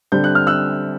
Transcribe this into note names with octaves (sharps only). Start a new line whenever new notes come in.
D3 G3 C4 G6
F#6
F6
E6 F#6